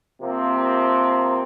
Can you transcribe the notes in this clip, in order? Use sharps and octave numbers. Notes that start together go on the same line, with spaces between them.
C3 F3 A#3 C4